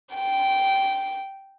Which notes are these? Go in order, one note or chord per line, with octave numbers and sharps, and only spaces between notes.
G5